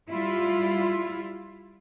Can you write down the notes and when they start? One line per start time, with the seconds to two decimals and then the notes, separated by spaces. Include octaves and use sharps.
0.11 G3 E4 F4